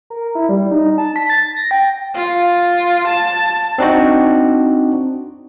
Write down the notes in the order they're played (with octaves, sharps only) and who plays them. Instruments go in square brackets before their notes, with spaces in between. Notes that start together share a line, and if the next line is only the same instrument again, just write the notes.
[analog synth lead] A#4
E4
G3
D#4
A5
B6
A6
A#6
G5
[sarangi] F4
A5
[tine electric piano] C4 D4 D#4 F#4